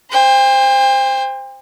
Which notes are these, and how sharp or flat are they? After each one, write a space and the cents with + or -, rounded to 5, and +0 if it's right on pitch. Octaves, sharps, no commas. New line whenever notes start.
C5 +0 G5 +40